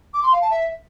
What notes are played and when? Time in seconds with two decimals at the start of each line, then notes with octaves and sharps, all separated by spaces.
0.14 D6
0.23 C6
0.32 F5
0.41 A5
0.50 E5